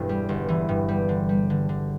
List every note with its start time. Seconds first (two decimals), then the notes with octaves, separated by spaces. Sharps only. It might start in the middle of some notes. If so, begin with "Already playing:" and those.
Already playing: E1 E2 G2 D4 G4 A4
0.09 G3
0.29 G1
0.49 E3
0.69 G2
0.88 G3
1.09 D3
1.29 G3
1.50 D3
1.69 D3